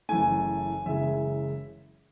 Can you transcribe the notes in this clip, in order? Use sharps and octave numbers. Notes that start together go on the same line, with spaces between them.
F#1 F#2 E3 A3 G#5
F#1 F#2 C#3 E3 G#3 E5